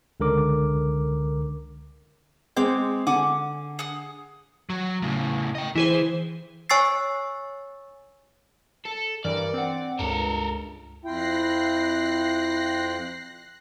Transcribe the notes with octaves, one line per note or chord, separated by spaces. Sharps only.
C#2 D3 A#4 D6
G#3 C4 C#5 D6 G6
D3 F#5 G#5 D6
G#4 F#5 D#6
F#3
A2 C#3
D#5 G5
E3 E4 G#4 C5
C#5 G#5 C#6 E6 A6 C7
A4
G2 E3 A#4 D5
C4 F#5
C#2 G2 A4 A#4
F2 E4 F4 G5 F#6 A#6 C7